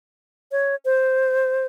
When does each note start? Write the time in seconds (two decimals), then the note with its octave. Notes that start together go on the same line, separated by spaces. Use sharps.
0.52 C#5
0.85 C5